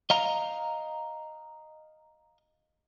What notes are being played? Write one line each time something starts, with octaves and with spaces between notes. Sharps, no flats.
D#5 F5 A#5